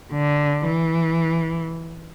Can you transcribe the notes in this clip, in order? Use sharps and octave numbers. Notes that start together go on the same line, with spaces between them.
D3
E3